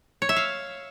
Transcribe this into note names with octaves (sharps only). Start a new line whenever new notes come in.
C#5
E5
F5